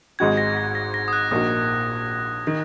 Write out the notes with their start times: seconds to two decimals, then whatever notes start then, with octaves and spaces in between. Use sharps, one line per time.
0.19 G#1 G#2 G#3 D#4 F#4 G#6
0.37 A#6
0.57 A#6
0.75 A#6
0.94 A#6
1.08 D#6
1.13 F#6
1.31 A#1 A#2 A#3 D#4 F#4 D#6
2.47 D#3